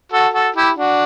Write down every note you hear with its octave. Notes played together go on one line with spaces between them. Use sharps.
F#4 A4
F#4 A4
E4 G4
D4 F#4